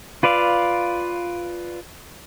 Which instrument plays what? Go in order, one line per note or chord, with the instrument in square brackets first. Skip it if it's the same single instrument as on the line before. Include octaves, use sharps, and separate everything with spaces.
[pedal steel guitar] F4 B4 D5 F5